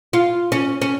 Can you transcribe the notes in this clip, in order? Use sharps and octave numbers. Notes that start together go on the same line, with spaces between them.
F4
C#4
C#4